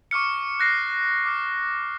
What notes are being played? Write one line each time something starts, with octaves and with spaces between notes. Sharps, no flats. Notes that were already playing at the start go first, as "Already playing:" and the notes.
C#6 D6 F6 C#7
F#6 A#6 C7 C#7
D6 F6 C7